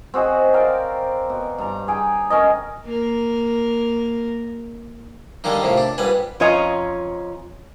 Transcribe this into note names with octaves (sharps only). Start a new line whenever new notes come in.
C4 F#4 G#4 D#5
A#4 D5 F5 G5
B2
G2 A#5
G#4 G5
C#4 A#4 D#5
A#3 A#4
D3 D#3 G3 G#3 A#3 D#4
F2 A2 C3 A#3
D4
A#1 G#2 G3 B4 G#5
F2 C#4 F4 C#5 D#5 A#5